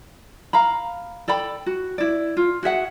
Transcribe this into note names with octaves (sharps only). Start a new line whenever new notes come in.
F5 A#5 B5
A4 D5 G5 B5
F#4
E4 D5
F4
F#4 G#4 E5 F#5